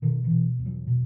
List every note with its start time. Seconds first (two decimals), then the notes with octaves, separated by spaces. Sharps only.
0.02 B2 D#3
0.24 E3
0.31 B2
0.59 E2
0.66 F#3
0.87 B2